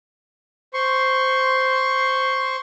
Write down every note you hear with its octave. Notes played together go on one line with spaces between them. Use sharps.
C5 C6 C#6